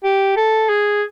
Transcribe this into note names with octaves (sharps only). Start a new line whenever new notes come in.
G4
A4
G#4